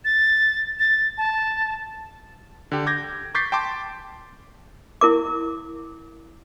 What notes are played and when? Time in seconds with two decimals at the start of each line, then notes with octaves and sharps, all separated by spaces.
0.05 A6
0.79 A6
1.18 A5
2.72 D3 G4
2.87 D6 G6 G#6 A#6
3.35 C#6 D6 G6 A6 B6 C7
3.52 G5 A5 C6 D6
5.01 E4 A#4 D6